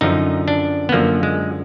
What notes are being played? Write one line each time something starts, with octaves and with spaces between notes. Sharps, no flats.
F#2 D3 F3 D#4
D4
B3
F#2 D3 F3 A#3
G#3